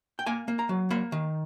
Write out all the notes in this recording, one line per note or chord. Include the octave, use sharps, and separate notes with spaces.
G5
A#3 G#5
A#3
A#5
F#3
A#3 B5
D#3